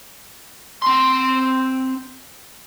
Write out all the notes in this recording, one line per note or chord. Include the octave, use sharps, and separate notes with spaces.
C4 C6